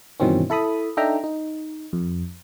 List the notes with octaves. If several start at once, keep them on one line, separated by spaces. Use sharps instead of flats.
G2 B2 D#3 E3 C4 C#4
E4 A4 B5 D#6
D4 D#4 A4 E5 G5 A#5
D#4
F2